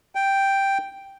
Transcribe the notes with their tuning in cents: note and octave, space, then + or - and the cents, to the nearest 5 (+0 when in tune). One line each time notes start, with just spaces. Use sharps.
G5 +0